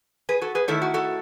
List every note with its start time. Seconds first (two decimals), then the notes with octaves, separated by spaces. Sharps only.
0.29 G#4 B4
0.41 F#4 A4
0.55 G#4 B4
0.68 D#3 A3 E4 A4 C#5
0.82 F#4
0.94 F#4 A4